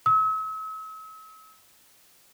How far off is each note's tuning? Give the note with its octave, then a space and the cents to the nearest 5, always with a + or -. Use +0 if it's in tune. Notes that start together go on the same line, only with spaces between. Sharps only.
E6 -45